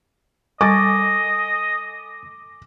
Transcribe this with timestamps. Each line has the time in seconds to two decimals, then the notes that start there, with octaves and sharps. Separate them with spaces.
0.61 G3 A4 D#5 G#5 C#6 D6 A6